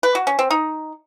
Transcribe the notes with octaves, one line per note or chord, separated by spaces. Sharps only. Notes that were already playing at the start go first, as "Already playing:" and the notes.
B4
F#4
C#4
C4
D#4